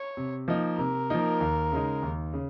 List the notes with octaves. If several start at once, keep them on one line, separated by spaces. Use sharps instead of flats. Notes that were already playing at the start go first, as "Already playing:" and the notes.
Already playing: C#5
C3
F3 A#3 D#4
C3 A#4
F3 A#3 D#4
D#2
C#3 G#3 D#4
D#2
C#3